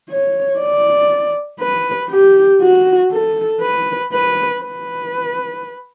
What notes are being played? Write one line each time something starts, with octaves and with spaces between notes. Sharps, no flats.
C#5
D5
B4
G4
F#4
A4
B4
B4
B4